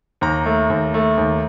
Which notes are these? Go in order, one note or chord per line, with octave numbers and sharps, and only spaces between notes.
D#2 A#5
A3
D#2
A3
D#2